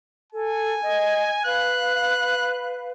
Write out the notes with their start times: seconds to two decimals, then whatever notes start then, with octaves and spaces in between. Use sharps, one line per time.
0.33 A4 G#5
0.82 D#5
1.45 B4 F5 F#6